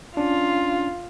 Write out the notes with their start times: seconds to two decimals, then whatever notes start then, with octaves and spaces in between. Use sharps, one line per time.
0.17 C#4 D4 F4